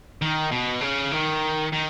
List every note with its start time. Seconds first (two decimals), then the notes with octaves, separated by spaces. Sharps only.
0.22 D#3
0.52 B2
0.81 C#3
1.12 D#3
1.72 D#3